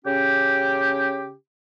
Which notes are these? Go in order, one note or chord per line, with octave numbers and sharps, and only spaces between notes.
C#3 C#4 G4